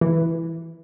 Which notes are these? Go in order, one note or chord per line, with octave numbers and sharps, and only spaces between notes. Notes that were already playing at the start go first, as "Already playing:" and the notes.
E3